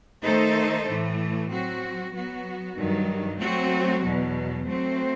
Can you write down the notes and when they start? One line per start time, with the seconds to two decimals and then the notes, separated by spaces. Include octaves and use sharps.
0.24 D#3 A3 D#4 A4 C5
0.87 A2 E3 A3
1.50 F#3 C4 F#4
2.14 F#3 B3 F#4
2.77 G2 D#3 F#3
3.40 F#3 A3 C4 F#4
4.03 E2 B2 F#3
4.66 F#3 A3 C4 F#4 C5